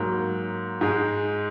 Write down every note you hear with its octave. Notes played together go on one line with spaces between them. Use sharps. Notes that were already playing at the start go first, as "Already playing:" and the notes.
Already playing: G#2 F#3 A#3
G#2 G#3